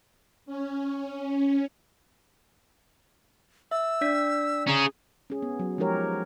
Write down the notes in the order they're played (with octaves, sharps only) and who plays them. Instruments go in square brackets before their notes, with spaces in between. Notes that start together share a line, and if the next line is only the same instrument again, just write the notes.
[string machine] C#4
[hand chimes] E5 [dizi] E6
[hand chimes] D4 D5 B6
[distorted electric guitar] C#4 G#4 [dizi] A#5
[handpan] C#4 G#4
B3
F#3
F3 G#3 D#4 G4 A#4 C#5